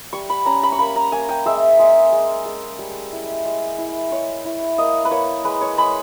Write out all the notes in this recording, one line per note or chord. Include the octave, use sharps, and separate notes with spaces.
G3 C#6
B5
C#4 A#5
B5
C#6
A#3 B5
A#5
A#3 G#5
G5
G#3 E5
G#3
G#3
G#3
G3
E4
G#3
E4
G#3 C#5
E4
A#3 D#5
B4
A#3 C#5
G#3 B4
C#5
G#3 B5